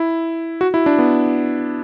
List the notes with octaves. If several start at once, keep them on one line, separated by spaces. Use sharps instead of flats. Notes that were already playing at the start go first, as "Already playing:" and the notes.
Already playing: E4
F#4
E4
D4
B3